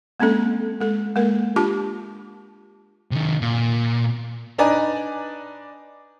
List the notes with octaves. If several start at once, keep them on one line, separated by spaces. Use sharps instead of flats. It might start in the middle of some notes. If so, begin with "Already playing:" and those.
G#3 A#3 C4 C#4 A4
G#3 A4
G#3 A#3 A#4
D4 F4 G4 A5 D6
C3 D#3
A#2
D4 D#4 B4 D5 G#5 A#5